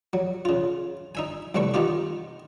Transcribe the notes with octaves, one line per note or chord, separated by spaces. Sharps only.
F#3
C#3 F4
D#4 E5 G#5
C2 G3 A3 B4 C#6
D#3 B3 F4 G4